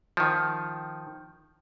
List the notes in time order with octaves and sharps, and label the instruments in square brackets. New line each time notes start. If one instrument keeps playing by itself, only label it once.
[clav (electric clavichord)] D#3 F3